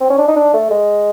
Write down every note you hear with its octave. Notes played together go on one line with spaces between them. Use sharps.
C4
C#4
D4
D#4
D4
A3
G#3